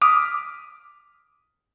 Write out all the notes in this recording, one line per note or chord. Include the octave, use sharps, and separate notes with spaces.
D6 D#6 F6 B6